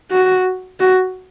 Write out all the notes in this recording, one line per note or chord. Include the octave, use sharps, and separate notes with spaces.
F#4
F#4